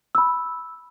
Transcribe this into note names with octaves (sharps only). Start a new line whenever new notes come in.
B5 E6